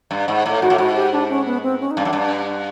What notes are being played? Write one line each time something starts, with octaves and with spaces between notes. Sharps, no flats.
G2
G#2
A2
G#2 F#4
A2
G#2 F#4
G4
D4
C#4
B3
C4
C#4
D#4
G2 D4
F#2
G2